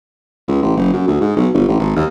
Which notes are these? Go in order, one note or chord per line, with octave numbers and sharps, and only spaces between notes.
C#2
A1
F#1
F#2
D2
G#2
B1
G1
A1
G#1
D#2